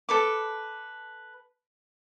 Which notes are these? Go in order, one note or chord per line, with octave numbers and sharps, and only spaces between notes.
A4 B4 D6